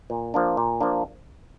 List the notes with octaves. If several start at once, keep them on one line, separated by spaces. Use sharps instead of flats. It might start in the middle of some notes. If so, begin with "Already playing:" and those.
A#2
F3 A#3 D4
A#2
F3 A#3 D4